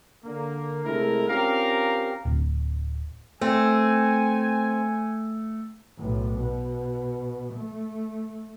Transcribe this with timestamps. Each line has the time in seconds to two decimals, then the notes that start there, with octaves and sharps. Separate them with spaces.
0.24 D3 A#3
0.85 C3 G#3 A3 E4 A#4
1.28 C4 C#4 F4 G4 A#4 F5
2.25 D1
3.41 A3 C4 G#5
5.97 B1 A2
6.38 B2
7.54 A3